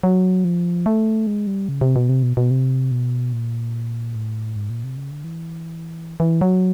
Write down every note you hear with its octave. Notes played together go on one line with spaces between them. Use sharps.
F#3
F3
A3
G#3
G3
C#3
C3
B2
C3
B2
B2
C3
B2
A#2
A2
G#2
A#2
C3
C#3
D3
E3
E3
F#3